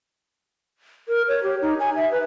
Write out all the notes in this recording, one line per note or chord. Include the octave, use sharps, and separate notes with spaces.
A#4
C#5
G4
D#4
G#5
E5
B4